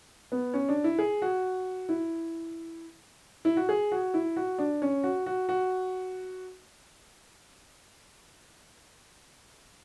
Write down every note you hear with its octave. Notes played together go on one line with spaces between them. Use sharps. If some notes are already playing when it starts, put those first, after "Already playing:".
B3
C#4
D4
E4
G#4
F#4
E4
E4
F#4
G#4
F#4
E4
F#4
D4
C#4
F#4
F#4
F#4